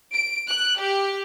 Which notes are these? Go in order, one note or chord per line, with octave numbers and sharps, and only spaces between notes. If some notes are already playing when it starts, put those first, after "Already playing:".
D7
F#6
G4